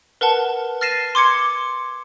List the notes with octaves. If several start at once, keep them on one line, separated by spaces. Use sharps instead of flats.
A#4 B4 F#5 A5
F6 A6 A#6 C7 D#7 E7
C6 D6 G#6 C#7